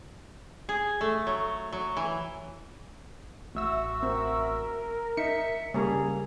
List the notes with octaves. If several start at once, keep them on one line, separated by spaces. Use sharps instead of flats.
G#4
A3
F#3
F#3
E3
A1 F#4 E5 E6
C4 A#4
D#4 E5 C#7
C#3 G3 A#3 G#4 A4 A#5